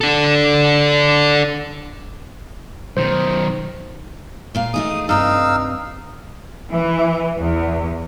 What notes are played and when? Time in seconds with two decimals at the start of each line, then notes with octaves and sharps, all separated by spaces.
0.01 D4 A4
2.97 B1 D#3 C5
4.55 A#2 A#3 F5
4.74 A3 D#4 G#4 D#6
5.09 G2 C3 D#4 F5 G5 E6
6.71 E3
7.38 E2